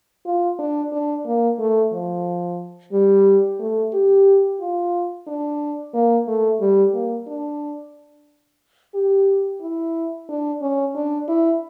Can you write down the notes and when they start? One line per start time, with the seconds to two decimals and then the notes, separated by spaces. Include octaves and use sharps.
0.26 F4
0.59 D4
0.92 D4
1.26 A#3
1.59 A3
1.93 F3
2.92 G3
3.60 A3
3.93 G4
4.60 F4
5.27 D4
5.94 A#3
6.28 A3
6.60 G3
6.94 A#3
7.27 D4
8.94 G4
9.61 E4
10.29 D4
10.61 C#4
10.96 D4
11.28 E4